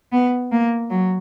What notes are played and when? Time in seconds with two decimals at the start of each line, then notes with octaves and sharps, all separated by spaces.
0.12 B3
0.52 A#3
0.90 F#3